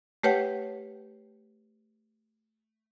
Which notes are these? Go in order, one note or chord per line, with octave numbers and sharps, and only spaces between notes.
A3 G4 B4 C#5 F#5 G5